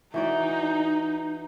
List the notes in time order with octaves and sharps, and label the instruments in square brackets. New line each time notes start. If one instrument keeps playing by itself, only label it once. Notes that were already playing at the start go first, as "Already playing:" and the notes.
[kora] E3 F#4 D5 [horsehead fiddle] D#4